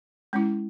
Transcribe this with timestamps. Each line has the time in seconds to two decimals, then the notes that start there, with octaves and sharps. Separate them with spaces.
0.33 G#3 C#4 E4